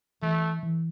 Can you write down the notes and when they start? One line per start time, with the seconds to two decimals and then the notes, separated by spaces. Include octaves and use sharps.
0.22 E3 A3
0.63 E3